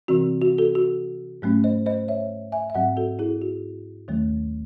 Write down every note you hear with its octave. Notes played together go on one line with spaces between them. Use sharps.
C3 E3 C4 F#4
F#4
F#4 A4
F#4
G#2 F#3 A3 C#4
C5 D#5
C5 D#5
C#5 E5
E5 G#5
E5
G#2 F#3 C4 D#5 F#5
F#4 A4
E4 G#4
F#4
D#2 D#3 F#3 A3